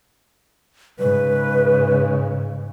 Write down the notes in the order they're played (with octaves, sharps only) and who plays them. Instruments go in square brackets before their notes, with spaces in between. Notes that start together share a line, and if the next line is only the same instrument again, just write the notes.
[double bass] G#2 C#3 [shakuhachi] B4